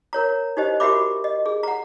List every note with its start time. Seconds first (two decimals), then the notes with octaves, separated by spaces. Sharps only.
0.13 A#4 C#5 A#5
0.57 D#4 G4 C5 D#5
0.80 F#4 G4 A#4 E5 B5 D6
1.24 D#5
1.46 G#4
1.63 F#5 A#5